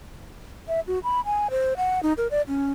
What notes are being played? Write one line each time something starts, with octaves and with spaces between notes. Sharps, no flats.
E5
F#4
B5
G#5
C5
F#5
D#4
A#4
D5
C#4